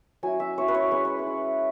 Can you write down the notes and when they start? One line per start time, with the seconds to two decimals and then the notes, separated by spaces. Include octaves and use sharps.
0.23 F#3 C#4 E4 G#5
0.40 E5
0.58 F#3 C#4 E4 C#5
0.68 B4
0.74 C#5
0.91 G#3 C#4 E4 B4
1.05 C#5
1.19 B4
1.26 G#3 C#4 E4